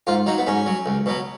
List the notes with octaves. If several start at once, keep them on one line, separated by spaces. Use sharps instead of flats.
G#2 F4
F#3 D#4
B3
G#2 C#4
F#3
C#2
B2 F#3